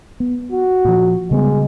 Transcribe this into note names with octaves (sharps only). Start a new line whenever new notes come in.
B3
F#4
A#2 F3
C#3 G3 G#3 B3